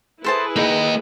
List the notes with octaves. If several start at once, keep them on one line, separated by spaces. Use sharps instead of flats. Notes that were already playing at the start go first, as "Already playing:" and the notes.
E4 G#4 A4 B4 C5 A5
A#3 D#4 D#5